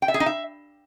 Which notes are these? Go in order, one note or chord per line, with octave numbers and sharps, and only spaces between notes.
G5
E5
G#4
D#4
E5